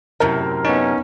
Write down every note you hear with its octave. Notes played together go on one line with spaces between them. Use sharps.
F#2 A2 C3 A#4
B3 C#4 D#4